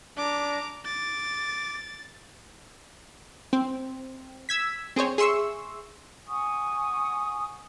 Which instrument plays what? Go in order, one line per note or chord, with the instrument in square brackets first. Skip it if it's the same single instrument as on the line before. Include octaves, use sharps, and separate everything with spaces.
[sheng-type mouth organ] D4 [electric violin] A#5 D6
[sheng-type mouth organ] D6 [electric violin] A6
[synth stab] C4
E6 G#6 B6
C4 G#4 C5 C#5
G#4 E5 C6 C#6 E6
[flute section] F#5 G#5 C#6 D#6